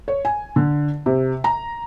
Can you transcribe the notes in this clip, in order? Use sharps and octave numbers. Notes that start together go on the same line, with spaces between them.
C#5
G#5
D3
C3
A#5